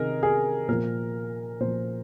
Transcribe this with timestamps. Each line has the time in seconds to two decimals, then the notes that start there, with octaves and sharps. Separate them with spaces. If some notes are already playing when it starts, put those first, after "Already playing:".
Already playing: C3 D#3 G#4 A#4 D#5
0.23 G#4
0.68 A#2 F3 A#4
1.60 A#2 C5
1.65 F3